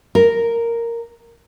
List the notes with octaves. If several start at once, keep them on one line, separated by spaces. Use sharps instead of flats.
A#4